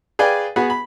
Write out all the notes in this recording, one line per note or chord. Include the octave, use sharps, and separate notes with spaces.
G#4 B4 D5 F5 G5 G#5
B3 F#4 G#4 F#5 B5
B5